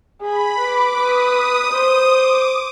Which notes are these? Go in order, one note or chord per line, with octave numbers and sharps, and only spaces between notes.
G#4 B5
B4 D6
B4 D#6
C5 D#6
D6